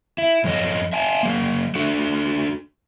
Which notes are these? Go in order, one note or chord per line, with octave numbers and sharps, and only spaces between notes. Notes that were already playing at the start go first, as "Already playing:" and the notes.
E4
F#2 F3 A4 C#5 D#5
E5 G#5 A5
F#3 A#3
D4 F#4 A4